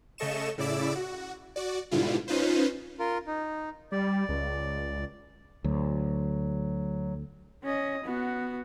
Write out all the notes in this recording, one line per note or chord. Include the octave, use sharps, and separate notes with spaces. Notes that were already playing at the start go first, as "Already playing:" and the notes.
C#3 A3 A4 D#5 C#6 E7
A2 C#3 E4 D5 D6 E6
F#4
F#4 D5
G#2 B2 D3 G3 E4 F4
C#4 D#4 F4 B4 C5
F4 A#4
D#4
G3 D5
C#2
D2 F#3
C#4 D#5
B3 F#4